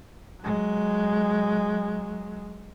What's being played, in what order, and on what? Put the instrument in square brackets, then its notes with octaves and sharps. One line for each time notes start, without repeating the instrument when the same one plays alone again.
[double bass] F#3 G#3